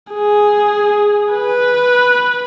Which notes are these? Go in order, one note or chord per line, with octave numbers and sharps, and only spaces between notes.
G#4
B4